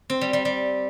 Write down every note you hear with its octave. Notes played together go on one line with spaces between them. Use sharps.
C4
G3
G3
G3